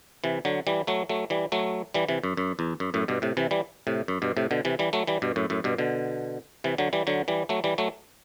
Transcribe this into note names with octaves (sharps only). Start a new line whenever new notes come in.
C3 E3
D3 F#3
E3 G3
F#3 A3
F#3 A3
E3 G3
F#3 A3
E3 G3
C3 E3
F#2
F#2
E2
F#2
F#2 A2
G2 B2
A2 C3
C3 E3
E3 G3
A2 C3
F#2
G2 B2
A2 C3
B2 D3
C3 E3
E3 G3
F#3 A3
E3 G3
G2 B2
F#2 A2
F#2 A2
G2 B2
B2 D3
C3 E3
D3 F#3
E3 G3
D3 F#3
E3 G3
F#3 A3
E3 G3
F#3 A3